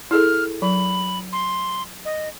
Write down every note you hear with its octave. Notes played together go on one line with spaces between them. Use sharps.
E4 G#4 A4 F6
F#3 B5
C6
D#5